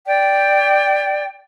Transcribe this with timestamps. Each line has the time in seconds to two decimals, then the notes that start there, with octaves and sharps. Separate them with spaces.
0.06 D5 G5